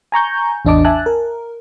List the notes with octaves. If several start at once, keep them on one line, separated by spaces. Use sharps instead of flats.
G#5 A#5 C#6 G6
A1 E2 D4 D#5 A5 D6
E5 G#5 A5 F#6
A#4